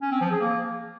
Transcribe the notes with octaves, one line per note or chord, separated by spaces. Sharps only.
C#4
C4
F3
G#4
A#3